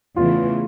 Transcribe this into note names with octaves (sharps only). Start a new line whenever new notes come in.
E2 C#3 E3 A3 F4